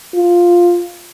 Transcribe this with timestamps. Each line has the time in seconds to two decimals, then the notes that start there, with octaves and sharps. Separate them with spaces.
0.15 F4